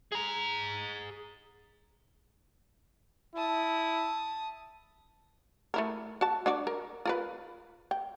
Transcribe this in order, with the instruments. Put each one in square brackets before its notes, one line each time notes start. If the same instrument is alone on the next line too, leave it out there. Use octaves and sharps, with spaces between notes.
[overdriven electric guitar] G#4 A#5
[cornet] E4 [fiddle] A5 D#6
[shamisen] A3 E4 A#4
F#4 A5
D4 F#4 D5
A#4
F4 A#4 B4
G5